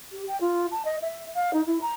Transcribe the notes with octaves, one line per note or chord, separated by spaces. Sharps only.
G4
G5
F4
A5
D#5
E5
F5
D#4
E4
A#5